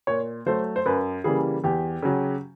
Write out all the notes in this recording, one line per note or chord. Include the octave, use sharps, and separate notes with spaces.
A#2 C#5
F#3 A3 C5
C5
F#2 B4
C#3 E3 G3 A#3 G#4
E2 G4
C#3 F#3